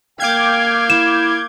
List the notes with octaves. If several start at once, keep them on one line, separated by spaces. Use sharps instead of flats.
A#3 F5 G5 D6 G6 G#6
E4 E7